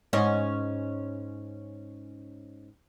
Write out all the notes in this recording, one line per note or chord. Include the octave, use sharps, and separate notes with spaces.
G#2 C#4 D#5